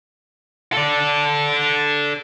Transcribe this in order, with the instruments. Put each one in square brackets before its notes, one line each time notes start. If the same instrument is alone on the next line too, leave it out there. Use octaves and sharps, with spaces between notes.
[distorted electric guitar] A4 D5